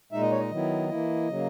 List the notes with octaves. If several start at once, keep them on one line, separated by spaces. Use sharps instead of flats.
A#2 G#3 D#4 E5
D#5
C#5
D#5
D#3 F#3 B3 E4
E3 A#3 E4
C#3 F#3 A#3